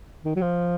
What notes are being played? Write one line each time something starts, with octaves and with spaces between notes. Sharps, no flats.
D#3
F#3
F3